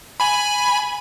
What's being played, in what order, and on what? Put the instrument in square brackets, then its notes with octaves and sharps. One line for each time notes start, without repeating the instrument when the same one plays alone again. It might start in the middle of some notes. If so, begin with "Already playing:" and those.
[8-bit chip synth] G#5 B5